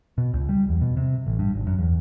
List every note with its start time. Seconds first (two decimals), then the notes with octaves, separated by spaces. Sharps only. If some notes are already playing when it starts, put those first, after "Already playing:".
0.18 B2
0.33 C#2
0.49 G3
0.69 E2
0.81 B2
0.97 C3
1.27 A1
1.39 G2
1.54 G#1
1.67 F#2
1.78 E2